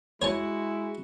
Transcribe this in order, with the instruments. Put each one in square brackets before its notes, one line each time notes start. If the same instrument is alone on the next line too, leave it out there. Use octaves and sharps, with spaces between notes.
[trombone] G#3 [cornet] E4 [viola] F#4 [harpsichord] C#5 G#5 A5